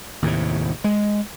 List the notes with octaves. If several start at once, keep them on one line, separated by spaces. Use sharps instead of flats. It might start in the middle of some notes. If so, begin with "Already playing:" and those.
D#2 A2 C3
G#3